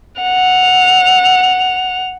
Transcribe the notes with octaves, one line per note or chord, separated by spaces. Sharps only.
F#5 F7